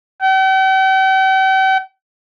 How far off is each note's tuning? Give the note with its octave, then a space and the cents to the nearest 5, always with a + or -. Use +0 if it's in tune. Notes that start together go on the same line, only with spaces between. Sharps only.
G5 -45